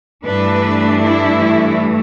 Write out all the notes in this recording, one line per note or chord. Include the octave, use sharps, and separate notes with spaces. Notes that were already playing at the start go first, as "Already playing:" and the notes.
G2 E3 A3 D4 B4
E4